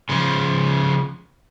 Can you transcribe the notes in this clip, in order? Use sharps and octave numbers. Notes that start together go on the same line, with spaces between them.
C#3 F3